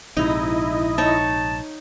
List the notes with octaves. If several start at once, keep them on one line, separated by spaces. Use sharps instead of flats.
A#1 G#2 C3 D#4 E4 D#5
D#4 C#5 A5